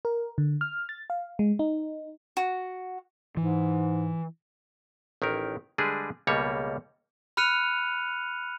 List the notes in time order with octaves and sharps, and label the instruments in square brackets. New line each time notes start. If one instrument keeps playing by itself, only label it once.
[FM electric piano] A#4
D3
F6
A6
F5
G#3
D#4
[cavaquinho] F#4
[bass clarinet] G#2 [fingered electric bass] E3
[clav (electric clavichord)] A1 D#3 E4 A#4
D3 G3 G#3 D4 G#4 B4
C#2 B2 G3 A#3 A4 C#5
[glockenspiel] B5 F6 F#6 C#7 D#7 F7